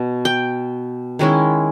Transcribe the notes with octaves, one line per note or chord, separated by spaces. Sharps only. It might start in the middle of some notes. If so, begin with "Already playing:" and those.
Already playing: B2
G5
D#3 G#3 C#4 E4